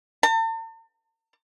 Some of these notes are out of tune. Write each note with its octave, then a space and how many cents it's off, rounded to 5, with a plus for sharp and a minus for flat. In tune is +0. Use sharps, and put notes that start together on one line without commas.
A5 +45